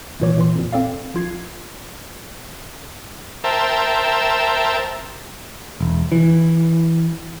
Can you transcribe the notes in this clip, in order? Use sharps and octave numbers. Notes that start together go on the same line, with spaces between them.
G#1 C#2 A#2 E3 C#5 D6
A#2 E3 C6
F2 A#2
C4 A4 D5 F5
A#1 F4 G#6 C7
A#4 C5 E5 G5 A5
E1
E3